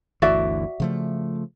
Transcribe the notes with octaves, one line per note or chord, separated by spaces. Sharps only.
G1 D2 E3 F#4 D5 E5
C#3 F3 A3